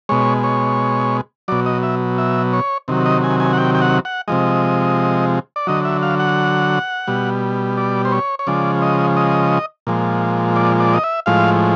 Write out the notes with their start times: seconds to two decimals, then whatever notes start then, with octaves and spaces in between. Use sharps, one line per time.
0.09 B2 G#3 C#5
0.44 C#5
1.48 B2 F#3 D5
1.66 D#5
1.83 E5
2.18 E5
2.53 C#5
2.88 C3 D#3 F#3
3.06 D#5
3.24 G#5
3.40 G#5
3.53 F#5
3.58 G5
3.75 G5
3.82 F#5
4.05 F#5
4.28 C3 F3 G#3 D#5
5.56 D5
5.67 D3 F#3 D#5
5.85 E5
6.03 F5
6.20 F#5
7.07 B2 G3
7.77 D5
8.05 C5
8.12 C#5
8.39 C#5
8.47 C#3 F3 G#3 D5
8.82 D#5
9.17 D#5
9.87 A#2 F3 G#3
10.56 D5
10.80 D5
10.94 D#5
11.04 E5
11.26 A2 F3 G#3 F5